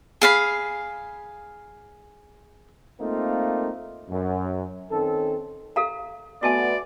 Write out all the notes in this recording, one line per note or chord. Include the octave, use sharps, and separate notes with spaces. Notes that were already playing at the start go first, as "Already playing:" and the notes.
G#4 F5 B5
A3 A#3 C4 D#4 F4 A#4
F#2
D#3 C4 C#4 A4
A4 F5 A#5
A3 B3 F#4 D5 E5 G#5 A5 C6